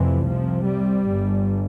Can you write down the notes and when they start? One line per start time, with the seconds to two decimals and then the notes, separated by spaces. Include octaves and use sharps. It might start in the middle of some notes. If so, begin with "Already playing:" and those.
Already playing: F1 F2 C3 E3
0.27 C2 C3 F3
0.66 G3
1.06 G1 G2